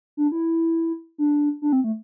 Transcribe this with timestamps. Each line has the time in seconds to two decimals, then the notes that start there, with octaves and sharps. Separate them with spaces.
0.17 D4
0.32 E4
1.18 D4
1.62 D4
1.72 C4
1.84 A3